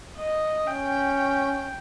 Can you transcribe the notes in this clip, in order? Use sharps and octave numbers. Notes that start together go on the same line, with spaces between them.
D#5
C#4 G5